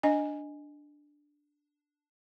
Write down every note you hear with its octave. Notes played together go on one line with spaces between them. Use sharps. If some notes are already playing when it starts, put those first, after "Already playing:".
D4 D#5 G#5